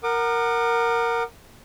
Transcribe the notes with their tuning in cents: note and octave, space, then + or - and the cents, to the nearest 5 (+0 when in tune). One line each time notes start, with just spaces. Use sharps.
A#4 +0 F#5 +0 D6 +45